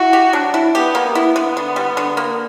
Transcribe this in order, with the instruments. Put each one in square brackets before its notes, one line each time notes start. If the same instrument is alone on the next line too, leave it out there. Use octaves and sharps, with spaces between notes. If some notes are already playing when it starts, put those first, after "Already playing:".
Already playing: [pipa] E4 [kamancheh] F#4
[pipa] G4
[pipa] F#3 [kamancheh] D4
[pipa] E4
[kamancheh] B3 [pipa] G4
[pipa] A#3
[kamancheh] B3 [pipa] E4
[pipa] D3
D3
G3
D3
A#3